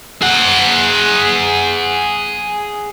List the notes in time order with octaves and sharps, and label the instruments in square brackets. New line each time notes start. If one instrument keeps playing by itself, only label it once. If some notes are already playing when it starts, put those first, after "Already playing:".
[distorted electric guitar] G#4 F#5